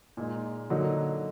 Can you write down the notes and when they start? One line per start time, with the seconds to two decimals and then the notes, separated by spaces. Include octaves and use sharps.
0.17 A#2 G#3 D#4
0.70 D3 F#3 A#3 D#4